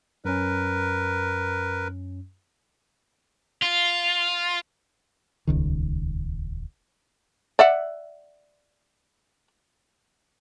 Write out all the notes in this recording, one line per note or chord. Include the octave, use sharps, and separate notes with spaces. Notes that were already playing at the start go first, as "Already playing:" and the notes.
F#2 C#4 A#4 B4
F4
D#1 C#2 D#3
D5 E5 F#5